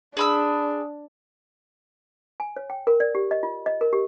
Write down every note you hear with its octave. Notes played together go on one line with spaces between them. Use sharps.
D4 G#4 B5 E6
G#5
C#5
G5
A#4
D5
G4
D#5
F4
D#5
A#4
G4